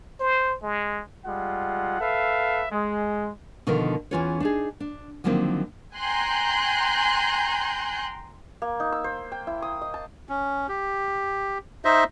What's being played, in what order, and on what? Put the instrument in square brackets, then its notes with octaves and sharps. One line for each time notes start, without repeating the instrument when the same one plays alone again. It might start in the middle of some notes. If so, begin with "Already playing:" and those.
[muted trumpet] C5
G#3
[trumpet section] G3 G#3 F4 F#5
A4 B4 E5 F5
G#3
[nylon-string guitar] B2 D3 D#3 F3 F4 A#4
E2 E3 C#4 F4 B4 C#5
D4 D#4 G#4
D4
D3 D#3 F3 F#3 A#3 C4
[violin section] G5 G#5 A#5 C6 F#6 G6
[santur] A#3
D#4
E6
C5
G5
E4
D#6
D#5
A5
[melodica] C#4
G4
D#4 C5 D#5 E5